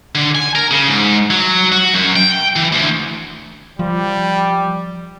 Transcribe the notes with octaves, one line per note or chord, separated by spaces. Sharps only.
D3
G#5
A#4
C#3
G#2
F#3
F#4
F#2
G5
E3
D2
F3 G3